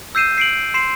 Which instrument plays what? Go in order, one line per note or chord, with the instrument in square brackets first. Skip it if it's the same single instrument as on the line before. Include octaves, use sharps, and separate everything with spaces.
[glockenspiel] E6 G6 C7 D#7 E7
C7 D7 F#7
C6 C7 E7